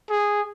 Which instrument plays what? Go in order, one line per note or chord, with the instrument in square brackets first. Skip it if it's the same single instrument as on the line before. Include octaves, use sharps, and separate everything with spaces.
[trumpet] G#4